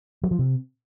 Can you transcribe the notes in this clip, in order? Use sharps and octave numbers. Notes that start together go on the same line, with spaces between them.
F#3
F3
C3